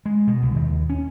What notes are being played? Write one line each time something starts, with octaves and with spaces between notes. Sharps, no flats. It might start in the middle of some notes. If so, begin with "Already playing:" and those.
G#3
B2
C2
D#2
C#4